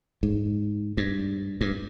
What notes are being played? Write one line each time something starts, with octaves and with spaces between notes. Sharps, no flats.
G#2
G2
G2